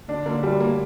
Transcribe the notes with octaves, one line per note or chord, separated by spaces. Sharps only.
D3 D4
D3 A#3
D2 G3
A#3